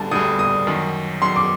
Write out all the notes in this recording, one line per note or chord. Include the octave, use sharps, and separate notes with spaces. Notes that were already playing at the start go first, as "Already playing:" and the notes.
Already playing: D2 D3 G3 A5
D2 D3 G3 D#6
D#6
F#2 D#3 F#3
F#2 D#3 F#3 C6
D6